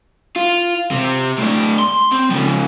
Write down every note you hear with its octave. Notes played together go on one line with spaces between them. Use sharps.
F4
C3 C4
A2 D4
C6
C4
C#3 F3